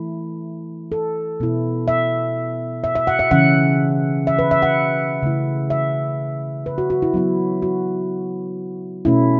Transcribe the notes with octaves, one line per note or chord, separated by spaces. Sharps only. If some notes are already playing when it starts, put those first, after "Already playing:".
Already playing: E3 A3 E4
A4
B2 B3 E4
E5
E5
E5
F#5
E5
C#3 E3 C#4 F#5
E5
B4
E5
F#5
C#3 A3 E4
E5
B4
F#4
F#4
E4
F#3 B3 E4
F#4
B2 A3 C#4 E4